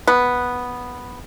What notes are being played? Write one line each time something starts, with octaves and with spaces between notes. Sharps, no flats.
B3